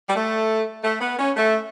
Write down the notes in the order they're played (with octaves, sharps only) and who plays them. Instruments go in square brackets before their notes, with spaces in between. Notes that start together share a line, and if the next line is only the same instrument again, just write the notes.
[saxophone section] G3
A3
A3
B3
C#4
A3